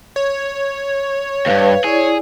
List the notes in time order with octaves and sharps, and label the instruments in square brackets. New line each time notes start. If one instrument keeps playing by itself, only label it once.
[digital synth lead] C#5
[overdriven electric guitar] D2 G2 [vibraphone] B4 F5
[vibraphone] E4 D5 [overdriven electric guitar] G#4